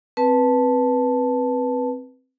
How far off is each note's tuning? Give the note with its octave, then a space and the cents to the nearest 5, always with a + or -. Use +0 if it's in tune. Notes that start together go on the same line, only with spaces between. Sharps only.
C4 +0 B4 -10 A5 +0